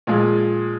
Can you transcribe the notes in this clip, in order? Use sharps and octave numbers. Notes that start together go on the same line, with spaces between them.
A#2 F3 G#3